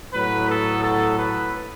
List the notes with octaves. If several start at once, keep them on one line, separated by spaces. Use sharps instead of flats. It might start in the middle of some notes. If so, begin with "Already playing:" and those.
A2 F#3 B3 B4
A4
A4
B4